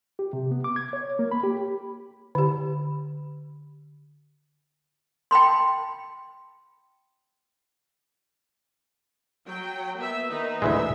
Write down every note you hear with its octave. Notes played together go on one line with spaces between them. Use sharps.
G4
C3
B3
D6
G#6
C#5
A#3
B5
G4
D3 G4
G5 A5 B5 C6
F#3 G5
A#3 B3 E5
D#3 D#4 B4
D2 E3 G#3 E5